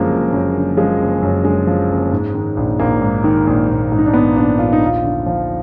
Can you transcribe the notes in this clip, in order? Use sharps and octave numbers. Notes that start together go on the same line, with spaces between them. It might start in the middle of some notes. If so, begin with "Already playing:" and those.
Already playing: F#2 D3 F3 G#3 A#3
F#1
F#2
D3
F3 G#3
F#1
F#2
D3 G#3
F3
F#1
G#2
D#3
A#1
A#1 A#3
G#2
D#3
A#1
A#1
G#2
D#4
D4
D#3 B3
A#1 D4
A#1 F4
D#4
D#2 F4
D3
F3